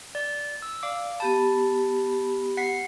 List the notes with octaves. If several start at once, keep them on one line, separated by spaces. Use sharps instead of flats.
D5
E6
D5 F5 D6
B3 G4 A5 B5
F#5 B6 C7